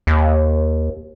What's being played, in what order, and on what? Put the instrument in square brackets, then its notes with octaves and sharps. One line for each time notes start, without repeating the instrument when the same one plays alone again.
[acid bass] D#2